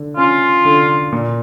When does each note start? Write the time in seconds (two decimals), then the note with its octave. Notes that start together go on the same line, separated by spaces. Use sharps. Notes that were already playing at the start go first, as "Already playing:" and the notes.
Already playing: D3
0.17 C#4 F4
0.65 D3
1.12 A#2